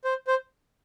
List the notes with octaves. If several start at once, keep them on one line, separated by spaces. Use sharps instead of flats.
C5
C5